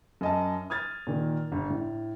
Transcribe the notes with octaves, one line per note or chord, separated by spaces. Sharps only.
F#2 D#5 A5
D#6 F6 G#6 A6
A#2 D#3
G1
A2